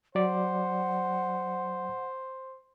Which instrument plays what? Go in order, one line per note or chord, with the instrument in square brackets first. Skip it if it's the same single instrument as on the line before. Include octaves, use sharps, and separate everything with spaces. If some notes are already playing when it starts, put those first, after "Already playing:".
[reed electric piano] F#3 D5 [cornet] C5 [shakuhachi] F#5